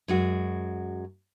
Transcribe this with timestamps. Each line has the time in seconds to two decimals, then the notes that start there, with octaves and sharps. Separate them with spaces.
0.08 F#2 G#3 F#4